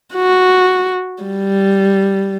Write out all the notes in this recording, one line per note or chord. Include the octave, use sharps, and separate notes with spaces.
F#4
G3